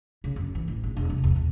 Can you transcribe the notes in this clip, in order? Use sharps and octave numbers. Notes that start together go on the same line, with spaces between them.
C#3
F#2
E3
A1
A#1
E1
C3
E2
B2